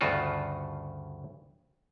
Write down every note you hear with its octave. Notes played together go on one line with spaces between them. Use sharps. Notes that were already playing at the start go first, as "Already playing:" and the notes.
D2 G2 C#3 F4 F#4